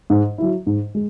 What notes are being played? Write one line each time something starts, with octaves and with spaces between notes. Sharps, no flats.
G#2
F#3 E4
G#2
G#3